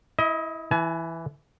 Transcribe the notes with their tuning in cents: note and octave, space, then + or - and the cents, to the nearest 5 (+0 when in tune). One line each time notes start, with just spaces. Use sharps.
E4 -10 D#5 +25
E3 +0 G#5 +40